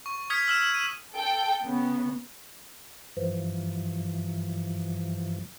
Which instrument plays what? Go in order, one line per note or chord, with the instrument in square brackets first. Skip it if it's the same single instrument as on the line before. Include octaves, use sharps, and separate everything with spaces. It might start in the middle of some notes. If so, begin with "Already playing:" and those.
[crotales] C#6
D#6 F6 G#6 B6 C#7
E6 F6 E7
D#7
[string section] A4 G5
C#3 B3
[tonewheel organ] G2 E3 F3